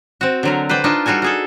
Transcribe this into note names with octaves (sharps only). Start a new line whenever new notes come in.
C4 F#4
D3 F#3 A#4
B4 C5 D5 G5
D4 D#4 F4 G5 A5
G3 F4 F#4 A4 G#5
F#4 G#4 A4